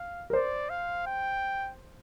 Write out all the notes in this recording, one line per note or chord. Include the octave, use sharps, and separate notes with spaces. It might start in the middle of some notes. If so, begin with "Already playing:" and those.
Already playing: F5
A#4
C5 D5
F5
G5